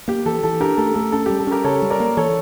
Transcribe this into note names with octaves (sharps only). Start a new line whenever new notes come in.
A#3 G4
E3 A4
E3 A4
D4 G4 A#4
A3 A4
A3 A4
C#4 A4
G3 G4
A4
C#4 G4 A#4
C#3 A4 C#5
G3
A#4 D5
A#3
E3 A4 C#5